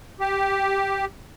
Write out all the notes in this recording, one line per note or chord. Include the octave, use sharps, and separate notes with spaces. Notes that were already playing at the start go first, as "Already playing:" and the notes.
G4